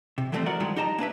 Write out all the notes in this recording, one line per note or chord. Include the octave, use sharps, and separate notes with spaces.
C3
E3 F3 G3 A3 A#3 C4
F#4 G#4 A#4 D5 F#5
G2 D#3 F3 G3 G#3
D#4 G4 D#5 A5 A#5
A#3 D4 B4 E5